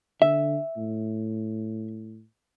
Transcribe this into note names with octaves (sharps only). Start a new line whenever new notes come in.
D3 E5
A2